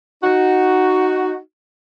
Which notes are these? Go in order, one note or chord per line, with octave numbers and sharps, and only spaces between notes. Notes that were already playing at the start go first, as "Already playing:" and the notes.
D#4 F#4